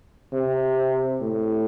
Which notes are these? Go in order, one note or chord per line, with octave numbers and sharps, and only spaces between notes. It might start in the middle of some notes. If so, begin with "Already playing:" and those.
C3
A2